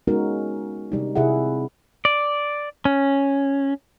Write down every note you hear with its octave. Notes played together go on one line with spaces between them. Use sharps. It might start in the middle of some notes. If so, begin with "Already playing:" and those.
G#3 B3 C#4 D#4 F#4 A#4
C3 G3 D#4
C3 E4 G#4 F#5
D5
C#4